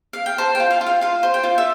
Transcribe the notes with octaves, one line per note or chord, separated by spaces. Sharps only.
F5
G5
C5 A5
G5
F4
F5
F4
F5
F4 F5
C5
G5
F4
E5